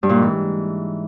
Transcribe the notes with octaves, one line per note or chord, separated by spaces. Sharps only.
G2
A#2
G#2
E3